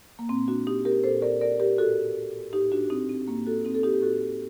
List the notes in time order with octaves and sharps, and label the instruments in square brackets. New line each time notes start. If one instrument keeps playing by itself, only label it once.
[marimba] A#3
A#2 C4
D4 F#4
D#4 G4
G4 A#4
A#2 A4 C5
A#4 D5
A#4 D5
G4 A#4
A2 F#4 A4
A2 D#4 G4
D4 F#4
F#4
C4 D#4
C4
A2 A#3
F#4 A4
C4 D#4
A4
D#4 G4
G4
A2 F#4 A4